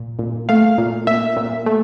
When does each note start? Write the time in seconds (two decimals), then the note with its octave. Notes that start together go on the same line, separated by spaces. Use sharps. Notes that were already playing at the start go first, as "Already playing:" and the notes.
Already playing: A#2
0.19 A#2
0.49 A3 F5
0.78 A#2
1.07 A#2 E5
1.37 A#2
1.66 A3